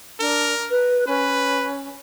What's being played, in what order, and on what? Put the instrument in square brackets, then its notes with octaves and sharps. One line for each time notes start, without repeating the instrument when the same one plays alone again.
[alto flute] D4 [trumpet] A#4
[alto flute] B4
[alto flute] C#4 [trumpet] B4